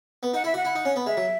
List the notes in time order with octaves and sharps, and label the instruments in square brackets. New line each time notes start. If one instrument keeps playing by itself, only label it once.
[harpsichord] B3
[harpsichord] D#4 [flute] F#5
[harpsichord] E4 [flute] E5
[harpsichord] F#4 [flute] F#5
[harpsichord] E4
D#4
C#4
B3
[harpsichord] G#3 [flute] E5
[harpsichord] F#3